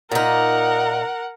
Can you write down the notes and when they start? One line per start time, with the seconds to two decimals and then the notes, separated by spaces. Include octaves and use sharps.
0.12 A#2 D#4 A#4 F#5